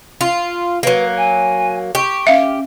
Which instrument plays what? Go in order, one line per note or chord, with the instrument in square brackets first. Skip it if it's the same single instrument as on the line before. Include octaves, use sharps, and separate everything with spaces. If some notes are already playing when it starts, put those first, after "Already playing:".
[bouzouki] F4
[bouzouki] F#3 A#3 [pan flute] B4
[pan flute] G#5
[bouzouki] G4 [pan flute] C#6
[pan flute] C#4 [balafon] E5 F5